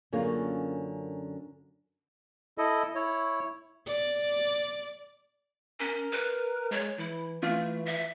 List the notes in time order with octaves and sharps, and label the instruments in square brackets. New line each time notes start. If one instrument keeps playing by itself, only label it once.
[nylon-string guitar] F#2 D3 A#3 C#4 F4 G#4
[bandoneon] E4 A4 D#5
E4 C#5
[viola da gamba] D5
[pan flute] C#4 [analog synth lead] A#4
[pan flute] B4
[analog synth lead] G#3 [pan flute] C#5
[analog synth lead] E3 [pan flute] E4
[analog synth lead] E3 [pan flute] A3 [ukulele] F4
[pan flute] E5